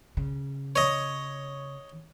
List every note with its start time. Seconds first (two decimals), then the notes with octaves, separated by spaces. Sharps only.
0.17 C#3
0.76 C#5 D#5